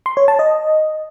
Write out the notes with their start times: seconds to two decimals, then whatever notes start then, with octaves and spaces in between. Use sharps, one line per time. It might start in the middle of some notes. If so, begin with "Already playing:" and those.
0.06 C6
0.17 C#5
0.28 A5
0.39 D#5